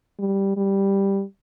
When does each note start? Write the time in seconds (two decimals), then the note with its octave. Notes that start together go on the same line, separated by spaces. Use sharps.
0.19 G3
0.57 G3